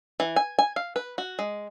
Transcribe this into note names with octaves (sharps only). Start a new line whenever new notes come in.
E3
G#5
G#5
F5
B4
F#4
G#3